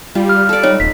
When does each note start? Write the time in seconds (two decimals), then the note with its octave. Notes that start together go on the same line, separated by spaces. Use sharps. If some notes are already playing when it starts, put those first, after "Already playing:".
0.15 G3 F4
0.29 F6
0.49 A4 D5
0.63 D#4 C#5
0.80 D#1 B6